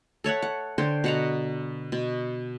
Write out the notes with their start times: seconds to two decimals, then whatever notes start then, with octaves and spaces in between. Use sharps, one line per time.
0.24 A4 C#5 E5 F#5
0.42 F#5
0.78 D3 C5 C#5 G5
1.04 B2 F#5 A#5
1.92 B2